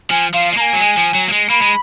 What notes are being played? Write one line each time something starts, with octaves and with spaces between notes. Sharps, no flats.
F3 G#5
F3 F5
G#3
A#3 G#5 A#5
F#3
G#3
F3
F#3
A#3
G#3
A#3 B5
G#3